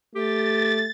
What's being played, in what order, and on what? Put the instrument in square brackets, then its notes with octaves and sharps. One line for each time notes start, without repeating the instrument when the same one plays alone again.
[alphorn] A3 [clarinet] G4 [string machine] A6